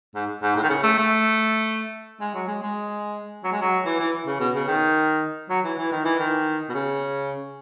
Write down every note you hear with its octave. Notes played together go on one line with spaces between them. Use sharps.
G#2
G#2
A2
D#3
C#3
A3
A3
G#3
F#3
G#3
G#3
F#3
G#3
F#3
E3
E3
C#3
B2
C#3
D#3
F#3
E3
E3
D#3
E3
D#3
B2
C#3